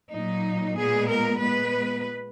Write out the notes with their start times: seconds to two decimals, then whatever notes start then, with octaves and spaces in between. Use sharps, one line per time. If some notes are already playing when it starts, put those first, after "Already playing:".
0.13 A#2 F#3 A#3 D#4
0.76 A#2 G#3 B3 G#4
1.09 A#4
1.40 A#2 G#3 B3 B4